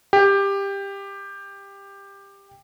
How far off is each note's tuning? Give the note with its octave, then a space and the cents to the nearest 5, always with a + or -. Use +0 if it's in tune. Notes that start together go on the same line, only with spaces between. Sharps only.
G4 +15